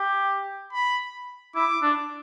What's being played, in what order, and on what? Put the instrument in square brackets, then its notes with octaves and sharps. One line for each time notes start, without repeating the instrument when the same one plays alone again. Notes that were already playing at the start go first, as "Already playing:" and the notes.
Already playing: [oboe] G4
[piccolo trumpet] B5
[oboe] E4 [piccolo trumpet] D6
[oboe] D4